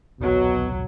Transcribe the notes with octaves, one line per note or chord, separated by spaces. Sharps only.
D#1 B1 B2 F#3